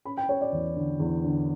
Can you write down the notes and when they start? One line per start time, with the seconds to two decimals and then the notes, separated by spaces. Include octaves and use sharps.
0.05 C#4 B5
0.17 G5
0.29 C#4 C#5
0.41 D5
0.52 E2
0.76 D3
1.00 E2
1.24 D3